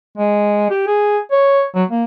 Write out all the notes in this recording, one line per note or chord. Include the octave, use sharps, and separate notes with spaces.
G#3
G4
G#4
C#5
F#3
A#3